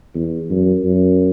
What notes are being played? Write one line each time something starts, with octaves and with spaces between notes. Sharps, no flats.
E2
F#2
F#2